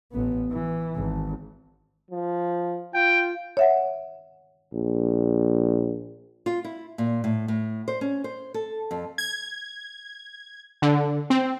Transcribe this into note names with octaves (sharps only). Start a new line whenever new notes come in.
A1 B3
E3
G#1
F3
F4 G5
C#5 E5 F#5
A#1
F4
E4
A#2
A2
A2
C5
C#4
C5
A4
F2
G#6
D3
C4